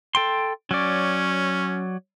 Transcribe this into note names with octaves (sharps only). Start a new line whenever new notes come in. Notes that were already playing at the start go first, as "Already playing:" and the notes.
A4 G5 C6
F#3 C#4 D5